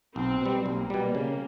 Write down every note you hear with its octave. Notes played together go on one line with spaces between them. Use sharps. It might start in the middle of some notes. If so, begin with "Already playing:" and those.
B1 C4
B2 G3
B1 A#3
B2 G3
C#3